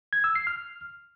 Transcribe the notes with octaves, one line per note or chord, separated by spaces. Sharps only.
G#6
E6
C7
F6